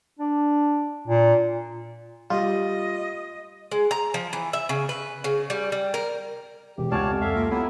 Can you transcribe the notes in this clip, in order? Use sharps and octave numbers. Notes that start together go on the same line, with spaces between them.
D4
A#2
G3 F4 D#5
G#3
A#5
F3
E3
E5
C#3
B4
C#3
G3
G3
A#4
E1 G4
C#2 C#5 D5 F5 F#5 G#5 A5 G#6
F2
A4 E5 F5
A#3 F4
F#3 B3 E4 G4 A#5 E6